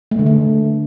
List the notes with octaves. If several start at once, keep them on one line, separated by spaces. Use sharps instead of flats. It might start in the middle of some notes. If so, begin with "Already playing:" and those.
A3
D3
A3